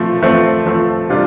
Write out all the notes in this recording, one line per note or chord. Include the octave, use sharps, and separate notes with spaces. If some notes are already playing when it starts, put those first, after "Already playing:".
Already playing: F3 A3 C4
F3 A3 C4
F3 A3 C4
C3 G3 D4 F4